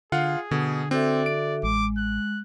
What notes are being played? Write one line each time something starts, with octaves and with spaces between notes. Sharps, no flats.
D3 F4 G#4 F5 F#5
B2 D3
C4 F#4 A4 D5 E5
D7
A1 G#3 D6
F#6